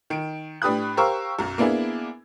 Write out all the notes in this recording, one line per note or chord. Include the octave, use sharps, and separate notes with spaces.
D#3 D7
A2 D4 G4 B4 D#6 F#6
G4 A#4 C5 F5 C#6 E6
B1 F#2
A#3 B3 D4 E4 G#4